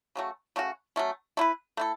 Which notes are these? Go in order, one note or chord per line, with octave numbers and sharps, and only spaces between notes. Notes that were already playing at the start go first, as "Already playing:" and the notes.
C#3 F#3 A3 F#4
C#3 A3 C#4 F#4
F#3 A3 C#4
A3 E4 B4
A3 E4 A4